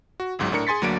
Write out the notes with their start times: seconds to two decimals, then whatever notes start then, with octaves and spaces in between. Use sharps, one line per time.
0.20 F#4
0.39 G1 C#2 G#2 F#3
0.52 A2 D4 A#4 C#7
0.67 G#4 G#5 C6 A6 B6
0.82 D2 F#3 A#3 D4 D7